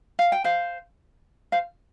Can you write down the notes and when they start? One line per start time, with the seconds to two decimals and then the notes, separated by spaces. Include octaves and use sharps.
0.19 F5
0.32 G5
0.44 C5 F5
1.52 C5 F5